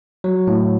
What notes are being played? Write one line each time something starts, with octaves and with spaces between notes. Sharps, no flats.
F#3
A2